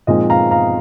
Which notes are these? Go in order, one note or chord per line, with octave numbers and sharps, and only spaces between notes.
A#2 F3 G#3 C4 D#4 D#5
F5 A#5
F5 A#5